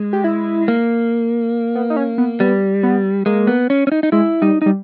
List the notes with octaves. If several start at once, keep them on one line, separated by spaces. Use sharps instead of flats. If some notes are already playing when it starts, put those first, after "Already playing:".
Already playing: G#3
G4
E4
A#3
B3
D#4
C#4
B3
G3 B3
B3
G#3 A#3
B3
C#4
C#4
D#4
D#4
G#3 E4
G3 D#4
D#4
G3